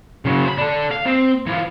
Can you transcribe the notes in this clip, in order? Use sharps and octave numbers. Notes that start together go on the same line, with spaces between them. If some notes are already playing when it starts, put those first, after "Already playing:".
C#3 F#3
C5 B5
D4 A4
F5
C4
E3 F4